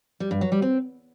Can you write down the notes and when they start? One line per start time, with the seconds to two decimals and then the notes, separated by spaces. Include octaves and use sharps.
0.20 G3
0.31 G2
0.41 F#3
0.52 G3
0.62 C4